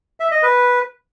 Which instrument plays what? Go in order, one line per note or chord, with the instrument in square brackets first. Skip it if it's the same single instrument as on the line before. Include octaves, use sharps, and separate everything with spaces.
[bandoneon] E5
D#5
B4